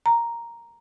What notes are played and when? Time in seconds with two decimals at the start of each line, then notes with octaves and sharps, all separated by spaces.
0.06 A#5